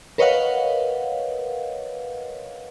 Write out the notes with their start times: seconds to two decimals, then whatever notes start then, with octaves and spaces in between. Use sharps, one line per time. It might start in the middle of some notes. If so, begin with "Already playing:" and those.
0.18 A#4 B4 C#5 D#5 F5 F#5